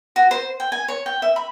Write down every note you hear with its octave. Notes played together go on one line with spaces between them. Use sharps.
F#4
C5
G5
G#5
C#5
G5
E5
B5